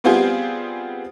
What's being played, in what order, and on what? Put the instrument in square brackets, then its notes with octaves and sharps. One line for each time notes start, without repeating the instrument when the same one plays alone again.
[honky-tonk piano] G3 B3 C4 F4 G4 G#4